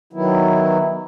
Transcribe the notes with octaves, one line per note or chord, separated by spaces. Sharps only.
D#3 F#3 B3 E4